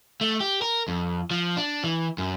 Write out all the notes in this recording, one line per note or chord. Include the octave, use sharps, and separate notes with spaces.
A3
G4
A#4
F2
F3
D4
E3
F#2